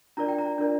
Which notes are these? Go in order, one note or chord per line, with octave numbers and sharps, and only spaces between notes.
D4 F4 A#4 D5 A#5
G5
A#5
D4 F4 A#4 D5